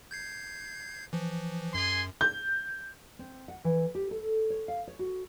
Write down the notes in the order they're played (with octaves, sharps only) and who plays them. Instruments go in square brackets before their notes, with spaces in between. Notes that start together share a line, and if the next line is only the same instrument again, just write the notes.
[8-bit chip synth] G6 G#6 C7
E3 F3
[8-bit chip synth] F#2 [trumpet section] G#4 G#5 C6
[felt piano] G6
[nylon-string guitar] C4
F#5
E3
G4
A4
C#5
F5
C#5
F#4